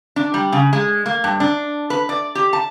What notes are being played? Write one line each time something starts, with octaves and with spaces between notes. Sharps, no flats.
D4
G3
C#3
G#3
A#3
G2
D4
B4
D5
G4
A5